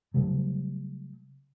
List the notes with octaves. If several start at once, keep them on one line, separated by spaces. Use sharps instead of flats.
C#3 F#3 G3 A3